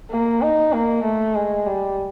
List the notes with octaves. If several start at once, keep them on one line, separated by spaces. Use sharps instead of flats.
A#3
D#4
A#3
A3
G#3
G3